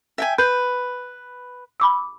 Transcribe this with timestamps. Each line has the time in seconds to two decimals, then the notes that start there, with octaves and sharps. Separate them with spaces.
0.18 E5 G5 G#5
0.38 B4 G6
1.80 B5 D6 E6